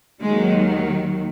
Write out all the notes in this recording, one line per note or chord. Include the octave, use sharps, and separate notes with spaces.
D#2 D#3 F#3 G#3